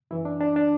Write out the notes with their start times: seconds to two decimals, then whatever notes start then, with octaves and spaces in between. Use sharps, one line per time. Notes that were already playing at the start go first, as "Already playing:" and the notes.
0.11 F#2 E3 E4
0.25 D4
0.41 D4
0.56 D4